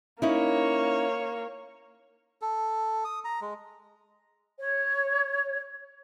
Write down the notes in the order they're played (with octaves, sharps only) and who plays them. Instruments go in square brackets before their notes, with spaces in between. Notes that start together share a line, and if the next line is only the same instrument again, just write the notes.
[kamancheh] A#3 C#5 [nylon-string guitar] C#4 D#4 E4
[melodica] A4
D#6
A#5
G#3
[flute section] C#5